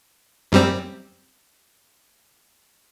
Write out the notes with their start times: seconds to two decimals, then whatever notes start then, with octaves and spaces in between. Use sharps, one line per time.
0.52 F#2 G3 C4